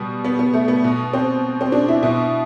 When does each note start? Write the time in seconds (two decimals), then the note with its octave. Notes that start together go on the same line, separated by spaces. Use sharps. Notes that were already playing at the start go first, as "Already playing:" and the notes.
Already playing: B2 G3
0.24 B3
0.39 B3
0.54 A3
0.68 B3
0.84 B2
1.13 C4
1.61 C4
1.72 D4
1.88 E4
2.03 B2 E4